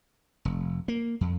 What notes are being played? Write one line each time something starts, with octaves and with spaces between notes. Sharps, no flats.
F1
A#3
F2